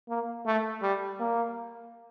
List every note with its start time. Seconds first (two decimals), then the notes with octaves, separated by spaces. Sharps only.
0.09 A#3
0.46 A3
0.82 G3
1.20 A#3